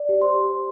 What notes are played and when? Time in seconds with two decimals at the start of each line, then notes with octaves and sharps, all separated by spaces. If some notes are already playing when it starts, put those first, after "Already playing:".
Already playing: D5
0.09 G4
0.22 C5 C6
0.34 G4